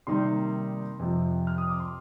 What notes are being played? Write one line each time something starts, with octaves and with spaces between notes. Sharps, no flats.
C3 D#3 G3 A#3 D#4 C6
F2 C3 F3
F6
D#6
D6
C6